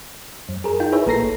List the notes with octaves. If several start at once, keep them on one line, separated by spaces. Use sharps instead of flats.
F#2
G#4 A#4
D#4 F4 G5
E4 G#4 B4 C#5 E5
A#1 A#3 A4 A#5 A#6 C7
G1